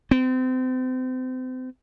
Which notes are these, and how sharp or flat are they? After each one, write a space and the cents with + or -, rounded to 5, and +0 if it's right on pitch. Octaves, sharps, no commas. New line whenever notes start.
C4 -35